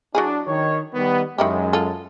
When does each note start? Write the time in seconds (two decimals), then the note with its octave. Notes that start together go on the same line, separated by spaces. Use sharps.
0.15 F#3 D4 E4 G#4
0.47 D#3 C#5
0.94 D#3 G3 B3
1.38 F#2 D#3 G#3 E4 G4
1.73 F4 A4